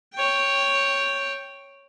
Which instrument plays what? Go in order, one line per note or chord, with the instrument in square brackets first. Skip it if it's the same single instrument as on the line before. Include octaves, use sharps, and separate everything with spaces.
[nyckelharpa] C#5 G5